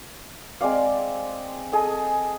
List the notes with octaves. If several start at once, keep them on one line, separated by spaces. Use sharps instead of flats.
G#3 C4 D5 F5
G#4 A4 D#5